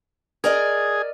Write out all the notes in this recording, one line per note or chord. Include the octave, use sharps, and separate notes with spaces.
G#4 A#4 D5 D#5